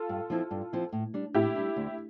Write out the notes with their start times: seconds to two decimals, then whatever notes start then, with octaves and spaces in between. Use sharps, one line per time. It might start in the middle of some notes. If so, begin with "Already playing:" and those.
Already playing: F4 A4
0.09 G2
0.30 F3 C4 E4
0.51 G2
0.73 F3 C4 E4
0.93 A2
1.14 G3 D4
1.34 A2 E4 G4
1.56 G3 D4
1.76 D2